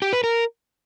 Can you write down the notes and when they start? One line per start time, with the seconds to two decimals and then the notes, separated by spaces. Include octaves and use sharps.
0.02 G4
0.13 B4
0.24 A#4